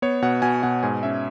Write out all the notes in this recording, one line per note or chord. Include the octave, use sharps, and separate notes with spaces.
B3 C#5
B2 F#5
B2 G#5
B2 F#5
G#2 G#5
C#4 E5